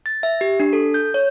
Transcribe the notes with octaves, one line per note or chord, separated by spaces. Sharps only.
A6
E5
G4
D4
A4
G6
C#5